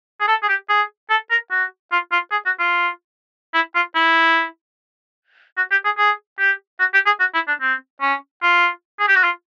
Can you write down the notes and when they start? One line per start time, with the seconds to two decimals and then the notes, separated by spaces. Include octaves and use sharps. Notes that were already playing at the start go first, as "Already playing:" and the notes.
0.20 G#4
0.28 A4
0.43 G#4
0.49 G4
0.69 G#4
1.10 A4
1.30 A#4
1.51 F#4
1.92 F4
2.12 F4
2.32 G#4
2.46 F#4
2.59 F4
3.54 E4
3.75 F4
3.95 E4
5.57 F#4
5.71 G4
5.85 G#4
5.98 G#4
6.39 G4
6.80 F#4
6.93 G4
7.06 G#4
7.20 F#4
7.34 E4
7.48 D4
7.61 C4
8.01 C#4
8.43 F4
9.00 G#4
9.08 G4
9.15 F#4
9.24 F4